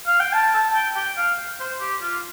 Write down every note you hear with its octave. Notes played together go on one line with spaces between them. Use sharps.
F5
G5
A5
A5
G5
G5
F5
C5
G4
F4